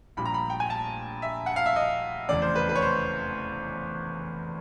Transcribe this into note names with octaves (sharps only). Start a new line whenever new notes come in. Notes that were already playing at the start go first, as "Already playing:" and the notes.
A#1 A#2 G3 B5
A#5
B5
G5
G#5
A5
E5
F#5
F5
E5
D#5
F1 E2 C#3 D5
C5
B4
B4
C#5
C5